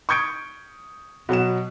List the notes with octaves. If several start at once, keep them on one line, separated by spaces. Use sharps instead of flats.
C#6 D#6 G6 G#6 C#7 D7
B2 F#3 F#5 E7